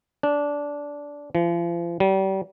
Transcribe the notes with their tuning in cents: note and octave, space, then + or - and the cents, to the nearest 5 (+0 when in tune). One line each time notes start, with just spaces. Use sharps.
D4 -15
F3 -40
G3 -35